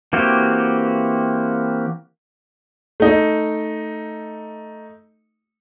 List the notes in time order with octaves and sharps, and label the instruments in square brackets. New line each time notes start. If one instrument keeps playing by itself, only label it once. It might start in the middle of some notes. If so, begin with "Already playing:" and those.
[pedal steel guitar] E3 A#3 C4 F#4 G4
[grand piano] A3 D#4